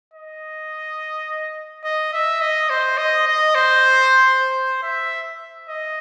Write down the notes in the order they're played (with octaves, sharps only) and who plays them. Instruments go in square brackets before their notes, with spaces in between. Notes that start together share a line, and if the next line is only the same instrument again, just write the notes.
[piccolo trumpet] D#5
D#5
E5
D#5
C5
D#5
D#5
C5
C5
E5
D#5